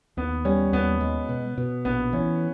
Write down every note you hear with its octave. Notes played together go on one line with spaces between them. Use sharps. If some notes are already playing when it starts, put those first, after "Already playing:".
D#2 B3
G3 C#4
D#2 B3
G#3
B2
B2
A#1 B3
E3 C#4